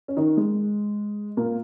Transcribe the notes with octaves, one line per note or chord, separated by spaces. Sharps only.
C#4
D#3 D#4
G#3
A#2 A#3